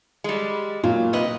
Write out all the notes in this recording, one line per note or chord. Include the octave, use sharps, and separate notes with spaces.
G3 G#3
A#2 F#3
C3 B4 D#5